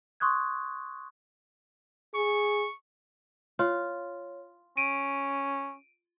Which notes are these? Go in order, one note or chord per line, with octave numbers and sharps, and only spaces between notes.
C6 C#6 D#6 F#6 G#6
G#4 C#6
F4 C#5
C#4 D7 D#7